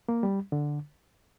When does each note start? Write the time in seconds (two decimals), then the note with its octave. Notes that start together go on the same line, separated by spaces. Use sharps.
0.09 A#3
0.23 G3
0.52 D3